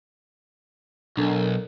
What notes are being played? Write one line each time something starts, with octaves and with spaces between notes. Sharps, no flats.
B1 D4 A4 A#4